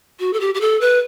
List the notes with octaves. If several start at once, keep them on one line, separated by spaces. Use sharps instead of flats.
F#4
A4
G4
G4
A4
B4